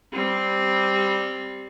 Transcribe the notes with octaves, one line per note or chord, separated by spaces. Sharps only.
G3 C4